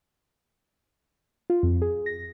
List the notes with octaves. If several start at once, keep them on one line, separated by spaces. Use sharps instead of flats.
F4
F2
G#4
A#6